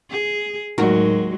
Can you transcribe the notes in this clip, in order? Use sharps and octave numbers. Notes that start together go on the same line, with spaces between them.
G#4
D#2 A2 F#3 G#3 D#4 F#4 A#4